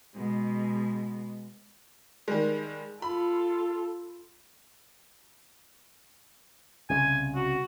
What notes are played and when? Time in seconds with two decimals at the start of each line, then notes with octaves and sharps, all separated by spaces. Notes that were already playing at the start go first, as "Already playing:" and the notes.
0.14 B2 G#3
2.28 D#3 G3 G#3
3.02 F4 A4 B5
6.90 C2 C#3 G#5
7.35 F#4